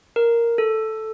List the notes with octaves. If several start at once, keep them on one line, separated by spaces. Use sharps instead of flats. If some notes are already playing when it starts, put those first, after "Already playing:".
A#4
A4